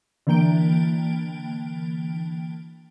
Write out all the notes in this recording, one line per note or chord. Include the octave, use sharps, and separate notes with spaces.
D3 E3 A#3 G5 D7